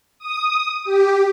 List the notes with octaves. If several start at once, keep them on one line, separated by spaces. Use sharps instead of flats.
D#6
G4